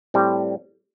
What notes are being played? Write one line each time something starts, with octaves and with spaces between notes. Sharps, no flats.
A2 G3 C4